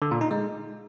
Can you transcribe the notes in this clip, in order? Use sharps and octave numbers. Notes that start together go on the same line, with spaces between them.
D3
A#2
D#4
G#3